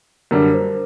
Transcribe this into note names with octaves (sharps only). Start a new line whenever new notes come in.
F#2 D3 G3 D4 A#4
C5